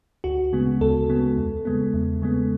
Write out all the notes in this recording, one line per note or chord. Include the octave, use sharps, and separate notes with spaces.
D2 F#4
C#3 G#3 B3
D2 A4
C#3 G#3 B3
E2
C#3 G#3 B3
E2
C#3 G#3 B3